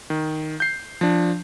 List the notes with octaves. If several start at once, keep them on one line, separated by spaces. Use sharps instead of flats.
D#3
G6 C7
F3 D4